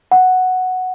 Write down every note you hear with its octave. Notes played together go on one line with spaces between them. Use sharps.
F#5